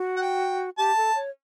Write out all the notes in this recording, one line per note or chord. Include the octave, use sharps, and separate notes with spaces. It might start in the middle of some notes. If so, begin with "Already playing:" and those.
Already playing: F#4
F#5
G5
G4 A5
A4
C#5